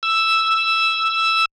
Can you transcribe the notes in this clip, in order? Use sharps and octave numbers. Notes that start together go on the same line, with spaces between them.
E6